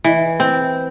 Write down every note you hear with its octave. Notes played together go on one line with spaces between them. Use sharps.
E3
C4